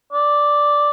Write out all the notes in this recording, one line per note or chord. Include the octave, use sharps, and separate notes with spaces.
D5